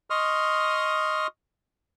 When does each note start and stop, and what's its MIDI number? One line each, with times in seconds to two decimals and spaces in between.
0.10 1.27 75
0.10 1.27 84
0.10 1.27 85
0.10 1.27 87
0.10 1.27 89